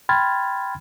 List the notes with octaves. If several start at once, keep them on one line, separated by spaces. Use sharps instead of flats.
G5 B5 C6 F6 G#6 A6